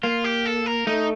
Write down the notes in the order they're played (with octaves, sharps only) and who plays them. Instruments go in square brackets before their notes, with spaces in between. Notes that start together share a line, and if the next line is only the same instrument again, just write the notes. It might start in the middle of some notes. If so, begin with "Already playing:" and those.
[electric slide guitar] A#3 [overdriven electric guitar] F4
[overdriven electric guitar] G4
A4
A#4
[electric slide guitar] A3 [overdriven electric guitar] D#4